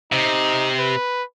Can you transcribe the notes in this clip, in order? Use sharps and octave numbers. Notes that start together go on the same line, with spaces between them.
C3 D#4
B4